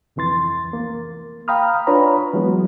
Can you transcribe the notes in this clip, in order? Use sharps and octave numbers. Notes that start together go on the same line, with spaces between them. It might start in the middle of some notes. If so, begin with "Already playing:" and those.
C2 F2 E3 C6 A6
A#3
F5 G5 A#5 B5 D#6 F6
D4 F4 B4 C#5 A#5 B5
E3 F#3 G#3 B3